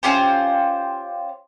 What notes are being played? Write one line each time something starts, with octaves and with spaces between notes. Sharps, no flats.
C#4 F4 G4 C5